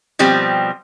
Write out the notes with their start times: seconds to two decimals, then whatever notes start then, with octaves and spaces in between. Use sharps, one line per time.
0.19 B2 F3 G3 C4